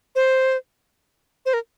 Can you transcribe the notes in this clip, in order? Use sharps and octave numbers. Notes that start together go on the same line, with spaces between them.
C5
C5
A#4